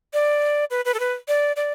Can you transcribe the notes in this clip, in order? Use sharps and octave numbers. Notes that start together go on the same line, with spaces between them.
D5
B4
B4
A4
B4
D5
D5